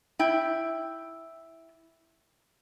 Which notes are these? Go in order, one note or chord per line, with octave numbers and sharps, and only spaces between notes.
E4 G5